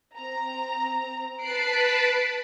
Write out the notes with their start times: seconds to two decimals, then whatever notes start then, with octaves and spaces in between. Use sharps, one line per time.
0.18 C4 A#5
1.42 B4 A5 B5 F#6 C7 D7